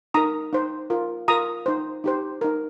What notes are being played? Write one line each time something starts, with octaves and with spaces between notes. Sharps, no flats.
D#4 A#4 A#5 D#6
D#4 C5
F4 A#4
F4 A#4 A#5 D#6
D#4 C5
D#4 G4 C5
D#4 A#4